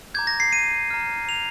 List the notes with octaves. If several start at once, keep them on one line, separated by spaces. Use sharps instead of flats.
A#5 D6 G6 G#6
A#6
C7
D#7
A#5 F6
F7